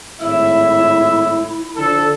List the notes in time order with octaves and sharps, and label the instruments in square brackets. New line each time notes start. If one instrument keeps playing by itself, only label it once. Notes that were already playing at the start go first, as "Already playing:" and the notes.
[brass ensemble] G#1 A2 E5 [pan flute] E4
[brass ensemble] D3 F3 A4